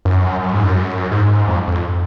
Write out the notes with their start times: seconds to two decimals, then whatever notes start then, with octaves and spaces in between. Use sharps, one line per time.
0.05 F#2
0.40 F#2
0.53 G#2
0.64 F#2
1.11 G#2
1.48 F2
1.68 F2